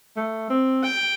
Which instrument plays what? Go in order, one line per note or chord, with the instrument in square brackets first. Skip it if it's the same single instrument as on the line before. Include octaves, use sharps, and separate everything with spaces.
[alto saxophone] A3
C4
[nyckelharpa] G5